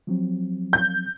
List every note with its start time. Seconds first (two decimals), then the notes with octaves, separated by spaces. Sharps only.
0.07 F3 F#3 C4
0.73 G6